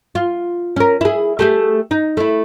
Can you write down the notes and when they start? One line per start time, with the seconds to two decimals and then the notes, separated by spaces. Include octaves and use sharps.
0.15 F4
0.76 C#4 A#4
1.01 E4 G#4
1.39 A3 G4 G#4
1.91 D#4
2.17 A3 E4